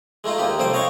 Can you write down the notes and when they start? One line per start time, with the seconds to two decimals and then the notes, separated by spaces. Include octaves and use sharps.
0.24 G#3 A3 D#4 F4
0.38 D#2 D#4 G4
0.59 C2 F3 A4 C5 G5
0.73 C#5 D#5 F5 G5 C#6